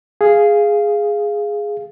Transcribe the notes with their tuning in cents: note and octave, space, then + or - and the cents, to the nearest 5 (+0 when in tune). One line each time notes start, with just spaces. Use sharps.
G#4 +0 F5 -10